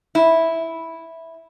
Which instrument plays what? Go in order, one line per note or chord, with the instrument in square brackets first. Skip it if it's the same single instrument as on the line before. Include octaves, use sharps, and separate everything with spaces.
[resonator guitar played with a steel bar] E4